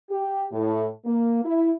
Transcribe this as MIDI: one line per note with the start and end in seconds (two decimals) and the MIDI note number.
0.10 0.45 67
0.52 0.86 45
1.05 1.41 58
1.45 1.71 64